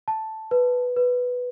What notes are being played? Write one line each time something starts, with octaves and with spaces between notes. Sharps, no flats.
A5
B4
B4